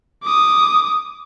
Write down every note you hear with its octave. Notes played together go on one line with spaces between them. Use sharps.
D6 D#6